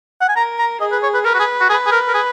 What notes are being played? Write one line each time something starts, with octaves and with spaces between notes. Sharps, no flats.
F#5
G#5
A#4 A#5
A#5
G#4 D#5
B4
C#5
B4
A#4 B4
F#4
G#4
F#4
G#4 B4
G#4
A#4
A#4
G#4